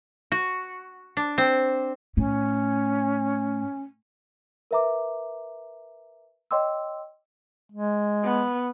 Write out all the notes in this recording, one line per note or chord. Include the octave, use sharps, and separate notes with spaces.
F#4
D4
C4
A2 C#4
A#4 B4 E5 A#5 D6
C#5 D#5 G5 C6 D6 E6
G#3
B3